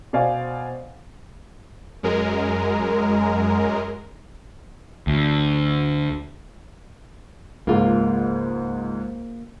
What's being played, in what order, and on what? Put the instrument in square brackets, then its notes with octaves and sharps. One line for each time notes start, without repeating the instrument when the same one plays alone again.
[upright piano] B2 C5 D5 F5 G#5
[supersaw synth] F#2 G#3 A#4
[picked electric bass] D2
[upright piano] C#2 G#2 [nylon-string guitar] A#3 F4